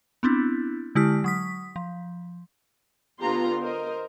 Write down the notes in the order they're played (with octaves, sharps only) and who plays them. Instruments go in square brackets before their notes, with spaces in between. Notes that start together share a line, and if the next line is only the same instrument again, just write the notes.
[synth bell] B3 C4 D4 E4
D3 G#3 E4 G4 F6
F#3 D#6 B6
F3
[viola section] D3 B3 F4 G4 A#5 C6
A#4 C5 D#5